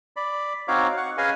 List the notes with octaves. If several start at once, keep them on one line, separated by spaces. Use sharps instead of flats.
D5 B5
C4 D#4 F#4 C#5 F5 D6
F#5 C#6
C#4 G#4 B4 D#5 F5 G#5